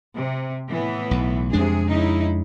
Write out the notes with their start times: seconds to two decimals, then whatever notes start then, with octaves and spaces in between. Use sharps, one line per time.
0.15 C3
0.69 A2 E3 B3
1.11 B1
1.53 F2 C3 G#3 D4 G#4
1.88 C#3 D#4 E4